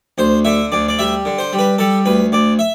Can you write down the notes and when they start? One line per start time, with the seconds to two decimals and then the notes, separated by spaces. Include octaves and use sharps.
0.18 D2 C5
0.45 D3 E5
0.72 D2 D5
0.89 D5
0.99 G3 E5
1.25 D3
1.38 C5
1.53 G3
1.59 B4
1.78 G3 A4
2.06 D2 B4
2.32 D2 D5
2.59 E5